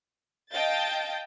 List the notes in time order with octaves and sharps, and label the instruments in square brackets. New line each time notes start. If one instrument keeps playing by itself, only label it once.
[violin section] D#5 F5 G5 A5 G6 A6